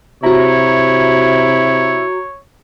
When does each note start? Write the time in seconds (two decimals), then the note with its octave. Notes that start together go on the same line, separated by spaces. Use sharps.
0.23 C3 E4 F#4 C#5 A#5